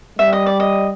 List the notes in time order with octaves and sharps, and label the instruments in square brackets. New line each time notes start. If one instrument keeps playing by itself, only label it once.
[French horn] G3 [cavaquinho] E5
[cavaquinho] D#5
D5
D#5